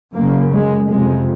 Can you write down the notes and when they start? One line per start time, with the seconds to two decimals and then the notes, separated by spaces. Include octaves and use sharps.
0.16 F#2 C#3 A#3
0.52 G#3
0.88 F2 C3 G#3